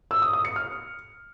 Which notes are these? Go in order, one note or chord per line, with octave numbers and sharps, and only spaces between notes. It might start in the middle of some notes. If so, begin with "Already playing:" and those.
E6
D#6
D#6
C#7
F6